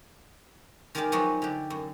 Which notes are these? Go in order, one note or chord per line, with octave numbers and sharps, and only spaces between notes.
D#3 G#3 G4 A#4 D5 A5
F3 F#3 G#3 B3 D#4 F#4
D3 G4
F#2